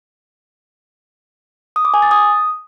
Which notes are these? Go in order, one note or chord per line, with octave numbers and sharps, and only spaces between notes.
D#6
D6
G#5
A6
D#6